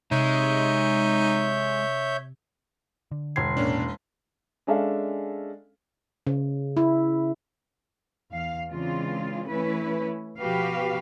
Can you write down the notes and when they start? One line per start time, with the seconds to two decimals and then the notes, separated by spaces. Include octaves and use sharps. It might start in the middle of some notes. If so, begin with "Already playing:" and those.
0.11 C3 G#3 D#4 C#5 E5 G6
3.11 D3
3.36 E1 C6 G#6 C7
3.57 A2 C3 A#3 C#4 D4
4.67 G#3 C#4 D4 A4 E5 F5
6.27 C#3
6.77 E4
8.30 E2 F5
8.69 C#3 E3 G#3 C4 D4 F4
9.48 E3 A3 C#4 E4 B4
10.38 B2 F3 F#4 G4 B4 F5